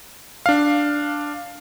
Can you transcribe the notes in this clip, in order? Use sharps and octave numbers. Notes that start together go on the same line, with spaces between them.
D4 F5